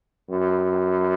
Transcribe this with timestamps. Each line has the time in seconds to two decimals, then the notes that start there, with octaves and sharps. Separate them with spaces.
0.30 F#2